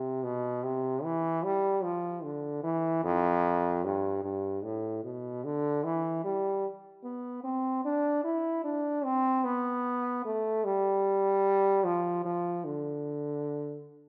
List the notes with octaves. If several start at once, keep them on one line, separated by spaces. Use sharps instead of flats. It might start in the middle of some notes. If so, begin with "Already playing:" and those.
Already playing: C3
B2
C3
E3
G3
F3
D3
E3
F2
G2
G2
A2
B2
D3
E3
G3
B3
C4
D4
E4
D4
C4
B3
A3
G3
F3
F3
D3